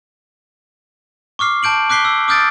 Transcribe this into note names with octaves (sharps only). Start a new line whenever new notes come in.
C#6 D6 F6 C7
A5 G6 D7 F#7
D6 F#6 B6 C7 G7
E6
D6 D#6 F6 G6 A6 D7